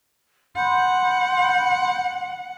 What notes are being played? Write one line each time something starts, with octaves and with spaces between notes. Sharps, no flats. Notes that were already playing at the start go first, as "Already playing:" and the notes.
F#5 B5 C6 G6